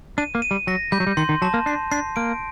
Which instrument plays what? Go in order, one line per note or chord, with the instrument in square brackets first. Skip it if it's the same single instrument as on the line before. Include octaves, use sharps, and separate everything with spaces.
[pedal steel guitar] D4 [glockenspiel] D#7
[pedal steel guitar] A#3
[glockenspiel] D#7
[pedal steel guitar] G3
[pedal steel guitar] F#3 [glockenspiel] A#6
[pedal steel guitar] G3 [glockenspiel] G6
[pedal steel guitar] F#3
G3
[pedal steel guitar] D#3 [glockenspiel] C6
[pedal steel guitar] D#3
[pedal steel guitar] F#3 [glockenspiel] A5
[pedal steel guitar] A#3
[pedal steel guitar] D4 [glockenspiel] C7
[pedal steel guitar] D4 [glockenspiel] C7
[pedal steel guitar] A#3 [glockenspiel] D7